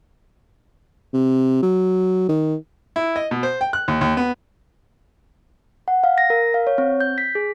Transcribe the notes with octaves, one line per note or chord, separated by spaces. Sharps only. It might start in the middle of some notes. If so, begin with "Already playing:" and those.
C3
F#3
D#3
E4
D#5
B2
C5
G5
F#6
D#2
D#2
B3
F#5
F5
A#6
A#4
F5
C#5
C4
G6
B6
G#4